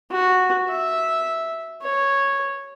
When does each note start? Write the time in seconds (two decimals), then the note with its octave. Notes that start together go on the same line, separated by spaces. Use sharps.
0.12 F#4
0.69 E5
1.83 C#5